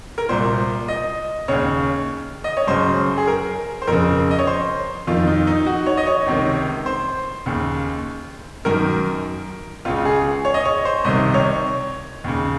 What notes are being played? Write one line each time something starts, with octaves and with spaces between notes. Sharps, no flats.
A#4
C2 A#2 C5
D#5
D#2 C#3 C#5
D#5
C#5
F#2 C#3 C5
G#4
A#4
C5
F2 C#3 A#4
D#5
C#5
C5
F2 D#3 F4
D#4
D#4
F#4
C#5
D#5
C#5
C#2 C3 D#3
C5
D#2 C#3
F#2 D#3 A#4
C#2 C#3 F4
G#4
C#5
D#5
C#5
C5
C2 C3 D#3 D#5
C#5
D#2 C#3